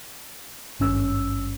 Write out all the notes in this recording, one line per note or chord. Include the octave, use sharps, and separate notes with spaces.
G#1 G2 C#4 E6